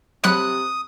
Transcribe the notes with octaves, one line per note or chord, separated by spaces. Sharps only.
C3 F#3 B5 D#6 F#6 C#7